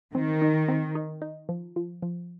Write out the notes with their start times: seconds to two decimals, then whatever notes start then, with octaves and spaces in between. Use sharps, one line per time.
0.15 D#3 C4
0.42 D#4
0.68 C4
0.95 D#4
1.22 D#4
1.49 F3
1.76 F3
2.02 F3